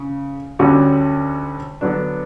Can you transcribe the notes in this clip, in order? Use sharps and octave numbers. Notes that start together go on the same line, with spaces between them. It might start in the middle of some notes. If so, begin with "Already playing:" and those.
Already playing: C#3
D2 D3 G3 C#4 F#4
D3 F#3 B3 D4